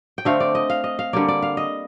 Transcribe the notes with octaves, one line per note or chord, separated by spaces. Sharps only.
G5
D3 A3 C4 F5
D5
D#5
F5
D#5
F5
D3 G3 A#3 D5
D5
F5
D#5